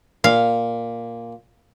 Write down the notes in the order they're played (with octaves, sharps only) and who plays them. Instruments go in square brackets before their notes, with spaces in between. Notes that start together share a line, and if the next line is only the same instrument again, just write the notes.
[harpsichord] A#2 [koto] F5